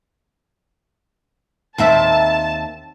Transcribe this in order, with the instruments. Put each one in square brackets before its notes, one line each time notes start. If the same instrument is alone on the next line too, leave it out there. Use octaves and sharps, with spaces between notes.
[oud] D#2 C4 E5 [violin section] A5